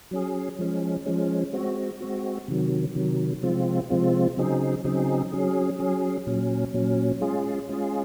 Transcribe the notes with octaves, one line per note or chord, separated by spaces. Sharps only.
F#3 C#4 G#4
F3 G#3 C#4
F3 G#3 C#4
G#3 C4 F#4
G#3 C4 F#4
C3 D#3 F#3
C3 D#3 F#3
C3 F3 G#3 C4 F4
C3 F3 G#3 C4 F4
C#3 F#3 C4 D#4 G#4
C#3 F#3 C4 D#4 G#4
F#3 C#4 G#4
F#3 C#4 G#4
A#2 F#3 C#4
A#2 F#3 C#4
G#3 C#4 F4 G#4
G#3 C#4 F4 G#4